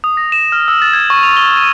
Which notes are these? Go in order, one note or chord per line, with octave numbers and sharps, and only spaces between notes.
D#6
A#6
E7
F6
E6
A6
G#6
C#6
F7
G7
D#7